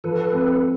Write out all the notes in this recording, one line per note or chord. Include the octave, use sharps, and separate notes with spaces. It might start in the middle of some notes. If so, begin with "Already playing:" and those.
F3 A4 B4
C4